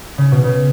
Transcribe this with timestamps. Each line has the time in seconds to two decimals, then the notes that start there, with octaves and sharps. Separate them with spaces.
0.18 C#3
0.32 B2
0.44 C#3